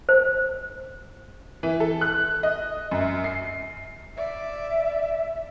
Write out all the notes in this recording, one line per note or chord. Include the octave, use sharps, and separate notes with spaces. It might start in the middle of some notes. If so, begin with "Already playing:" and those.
C5
E3
A4
F#6
D#5
F#2
C7
D5 E5